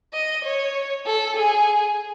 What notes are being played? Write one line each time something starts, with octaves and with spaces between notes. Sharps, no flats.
D#5
C#5
A4
G#4